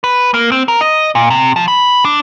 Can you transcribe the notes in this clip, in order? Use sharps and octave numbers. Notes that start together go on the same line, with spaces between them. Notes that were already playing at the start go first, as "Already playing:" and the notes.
B4
A#3
C4
A#4
D#5
A#2
C3
F3
B5
D4